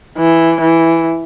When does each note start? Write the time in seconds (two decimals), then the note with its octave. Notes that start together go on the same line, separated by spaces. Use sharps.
0.18 E3
0.61 E3